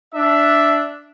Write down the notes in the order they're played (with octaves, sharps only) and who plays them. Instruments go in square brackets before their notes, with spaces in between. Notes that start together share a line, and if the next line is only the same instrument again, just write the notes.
[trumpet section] D4 E5